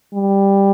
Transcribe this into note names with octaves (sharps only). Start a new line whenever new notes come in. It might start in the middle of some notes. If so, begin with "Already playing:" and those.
G3